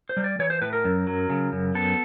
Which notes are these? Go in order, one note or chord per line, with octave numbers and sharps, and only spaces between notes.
C5
G3
D5
E3 C#5
C5
A2 B4
A#4
F#2
F#3
C#3
F#2
B3 A4